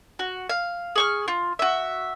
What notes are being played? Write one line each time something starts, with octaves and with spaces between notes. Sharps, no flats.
F#4
F5
G#4 C#6 F6
F4
F#4 E5